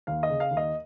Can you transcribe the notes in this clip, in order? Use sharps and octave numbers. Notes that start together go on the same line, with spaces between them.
D#2 F5
D#5
C#3
F5
D#2
D#5